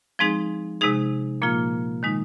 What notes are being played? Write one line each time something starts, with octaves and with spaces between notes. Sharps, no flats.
F3 G#3 C4 D#4 G#4
C3 G#3 D#4 G#4
A#2 F3 A#3 F4
D#3 G#3 D#4